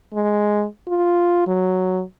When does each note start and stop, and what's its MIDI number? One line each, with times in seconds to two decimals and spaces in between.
0.14 0.66 56
0.88 1.46 65
1.47 2.03 54